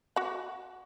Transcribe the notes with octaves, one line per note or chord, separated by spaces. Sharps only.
F#4 F#5